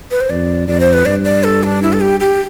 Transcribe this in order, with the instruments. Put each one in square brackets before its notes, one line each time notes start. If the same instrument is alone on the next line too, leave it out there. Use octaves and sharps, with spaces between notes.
[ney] B4
C5
[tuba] F2 [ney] D5
[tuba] F2 [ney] D5
[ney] C5
B4
[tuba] G2 [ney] D5
[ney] D5
A4
D4
E4
A4
G4
G4